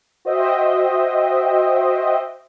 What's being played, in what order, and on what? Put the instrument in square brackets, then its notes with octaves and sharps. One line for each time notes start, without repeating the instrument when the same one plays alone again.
[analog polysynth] F#4 C5 D#5 E5 G5